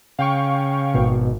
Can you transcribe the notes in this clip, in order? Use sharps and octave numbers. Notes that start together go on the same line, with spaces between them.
C#3 F5 G5 C#6
G#1 B2